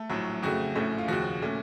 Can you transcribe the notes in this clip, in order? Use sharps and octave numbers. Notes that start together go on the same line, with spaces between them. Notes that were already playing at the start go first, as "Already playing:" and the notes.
Already playing: A3 A4
A#1 A2 F#3
F2 C#3 A3 F#4
A#1 A2 A3 C#4
F4
D#2 C#3 F3 F#4
A#2 A3 C#4